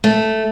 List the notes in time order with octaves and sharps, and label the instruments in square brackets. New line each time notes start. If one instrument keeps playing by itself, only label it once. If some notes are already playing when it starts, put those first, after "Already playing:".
[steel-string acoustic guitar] A3